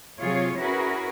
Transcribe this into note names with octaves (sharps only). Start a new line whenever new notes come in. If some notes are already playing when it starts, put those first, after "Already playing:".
C3 F#3 F4 G#4 C#5
C#4 E4 F#4 G#4 A#4 B4